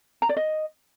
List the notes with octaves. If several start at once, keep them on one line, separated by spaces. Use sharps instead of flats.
A#5
D5
D#5